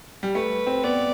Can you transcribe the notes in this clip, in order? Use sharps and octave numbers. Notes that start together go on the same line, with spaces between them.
G3
A3 B4
C4
B3 D5